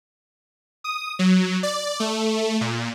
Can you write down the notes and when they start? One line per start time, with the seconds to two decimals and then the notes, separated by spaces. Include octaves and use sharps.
0.84 D#6
1.19 F#3
1.63 D5
2.00 A3
2.61 A#2